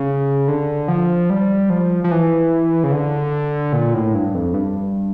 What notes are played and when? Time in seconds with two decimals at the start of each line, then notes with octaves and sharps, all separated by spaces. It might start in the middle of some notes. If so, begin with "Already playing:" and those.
Already playing: C#3
0.48 D3
0.88 F3
1.30 G3
1.70 F3
2.04 F3
2.11 E3
2.84 C#3
2.92 D3
3.73 A#2
3.94 A2
4.14 G2
4.34 F2
4.54 G2